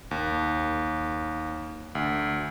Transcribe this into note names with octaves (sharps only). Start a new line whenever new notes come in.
D#2
D2